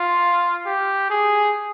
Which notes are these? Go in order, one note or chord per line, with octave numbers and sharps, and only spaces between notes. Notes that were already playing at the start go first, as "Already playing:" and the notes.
Already playing: F4
G4
G#4